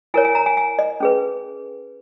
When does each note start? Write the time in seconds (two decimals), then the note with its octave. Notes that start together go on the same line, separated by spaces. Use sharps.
0.14 E4 A#4 C#5 G#5
0.25 G#5
0.35 A#5
0.46 G#5
0.57 G#5
0.79 D#5
1.00 C#4 G#4 B4